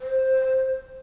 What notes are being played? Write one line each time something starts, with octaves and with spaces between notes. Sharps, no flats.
C5